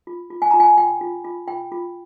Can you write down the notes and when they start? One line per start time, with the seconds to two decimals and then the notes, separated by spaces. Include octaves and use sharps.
0.07 F4
0.30 F4
0.42 G#5
0.51 F4 A#5
0.60 G#5
0.77 F4 G5
1.01 F4
1.24 F4
1.47 F4 G5
1.72 F4